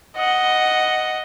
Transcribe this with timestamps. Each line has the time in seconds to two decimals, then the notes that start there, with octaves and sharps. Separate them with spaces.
0.17 D#5 F#5